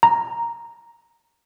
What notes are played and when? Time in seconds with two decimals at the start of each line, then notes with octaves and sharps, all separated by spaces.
0.03 A#5